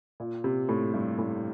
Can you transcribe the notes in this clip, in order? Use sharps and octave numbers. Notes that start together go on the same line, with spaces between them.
A#2
C3
A2
G2
A2